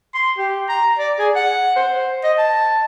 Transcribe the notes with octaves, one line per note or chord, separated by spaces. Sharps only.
C6
G4
A#5
D5
G#4
F#5
C5
D#5
A5